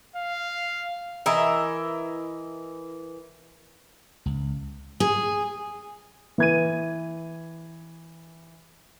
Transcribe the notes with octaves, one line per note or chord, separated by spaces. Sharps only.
F5
E3 A#4 D#5 E5
C#2
G#4
E3 G#6 D#7